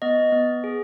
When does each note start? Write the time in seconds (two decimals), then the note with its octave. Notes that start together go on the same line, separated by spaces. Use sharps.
0.02 B3 D#5
0.32 B3
0.64 G#4